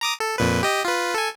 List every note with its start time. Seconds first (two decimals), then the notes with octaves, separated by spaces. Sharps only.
0.01 A#5 D6 D#6
0.20 A4
0.38 F2 A#2 B4
0.63 G4 D#5
0.85 F4 B4
1.14 A4 G#5